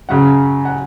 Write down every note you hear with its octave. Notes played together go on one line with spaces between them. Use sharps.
F#2 C#3 F#3 F#5
F#5